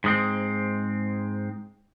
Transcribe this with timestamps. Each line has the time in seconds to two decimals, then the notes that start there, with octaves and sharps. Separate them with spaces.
0.04 G#2 G#3 C4